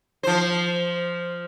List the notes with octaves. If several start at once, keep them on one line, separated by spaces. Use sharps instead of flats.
F3 C5